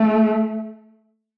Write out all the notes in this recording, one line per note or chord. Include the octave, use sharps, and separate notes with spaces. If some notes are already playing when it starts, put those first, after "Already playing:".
Already playing: A3